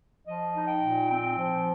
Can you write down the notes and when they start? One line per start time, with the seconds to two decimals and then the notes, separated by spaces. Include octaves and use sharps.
0.24 F3 D#5
0.54 D#4
0.67 G5
0.81 A#2
1.09 C4 G5
1.38 F3